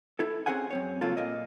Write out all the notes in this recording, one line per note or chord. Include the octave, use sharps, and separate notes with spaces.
E4 A4
C4 C#4 G#4 C5 F#5 G#5
F#2 C4 C#5
C#3 F#3 A#3 C4 F4 A4
A#2 A#3 D#5